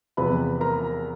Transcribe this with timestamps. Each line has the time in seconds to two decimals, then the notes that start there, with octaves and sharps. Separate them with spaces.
0.17 E2 C3 F3 B4 B5
0.61 A#4 A#5